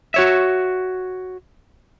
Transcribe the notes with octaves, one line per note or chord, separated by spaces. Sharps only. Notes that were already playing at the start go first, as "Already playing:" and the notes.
F#4 C#5 E5